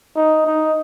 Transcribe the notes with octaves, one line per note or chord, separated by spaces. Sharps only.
D#4
D#4